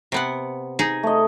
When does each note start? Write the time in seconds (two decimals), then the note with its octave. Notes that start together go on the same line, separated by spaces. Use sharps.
0.12 C3 B3 F#5
0.79 D#4 G#4
1.03 A3 D#5